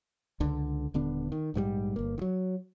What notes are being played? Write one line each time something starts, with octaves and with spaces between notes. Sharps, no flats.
C#2 D3
D#1 D3 B3 D4
D#3
A#1 G#2 D#3 G3
G1 A#3
D#3 F#3